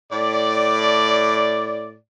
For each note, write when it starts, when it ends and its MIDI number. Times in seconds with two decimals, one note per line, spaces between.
0.12 1.95 45
0.12 1.95 74